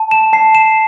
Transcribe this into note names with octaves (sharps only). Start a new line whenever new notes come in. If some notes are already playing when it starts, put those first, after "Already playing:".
Already playing: A5
E7
A5 C7
E7